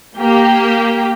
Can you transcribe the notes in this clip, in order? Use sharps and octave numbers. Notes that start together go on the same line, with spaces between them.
A#3 G4